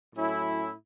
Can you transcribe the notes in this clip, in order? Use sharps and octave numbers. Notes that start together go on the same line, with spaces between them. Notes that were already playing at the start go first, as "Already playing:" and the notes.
A2 F#3 C#4 E4